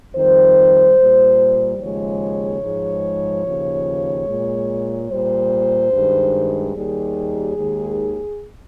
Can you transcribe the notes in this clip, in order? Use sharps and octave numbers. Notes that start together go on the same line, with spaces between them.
F2 D#3 G3 C5
A#2 G3
D#2 C#3 F3 G#3 C#5
G#2 F3 G#3
D#2 C#3 F3
A#2 G#3
A#2 G3 C5
G2 D#3 G#3
D#2 D#3 G3 G#4
D#2 D#3 G#3